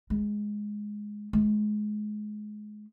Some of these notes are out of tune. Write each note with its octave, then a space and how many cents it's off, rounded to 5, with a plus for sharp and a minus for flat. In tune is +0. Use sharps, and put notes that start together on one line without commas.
G#3 +5
G#3 +25